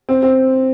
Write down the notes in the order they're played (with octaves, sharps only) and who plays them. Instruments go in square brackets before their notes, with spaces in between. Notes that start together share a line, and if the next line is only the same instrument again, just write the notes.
[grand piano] C4
C4